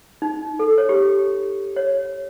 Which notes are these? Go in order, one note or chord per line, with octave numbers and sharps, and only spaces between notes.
D#4
A4
C#5
G4
C#5